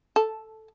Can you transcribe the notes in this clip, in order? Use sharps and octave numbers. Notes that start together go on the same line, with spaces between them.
A4